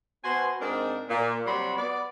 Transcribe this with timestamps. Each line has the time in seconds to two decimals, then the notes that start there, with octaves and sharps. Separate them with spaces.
0.24 B2 B3 F#4 C5 G#5 C6
0.61 G#2 G#3 C4 D4 D#4 A#4
1.09 A#2
1.46 C3 F#3 G3 F#4 B5 C6
1.76 B3 D5